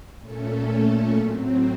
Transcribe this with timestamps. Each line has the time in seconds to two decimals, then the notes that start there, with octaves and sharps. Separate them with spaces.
0.18 A#2 A3 C#4 A4
1.15 A2 F#3 C4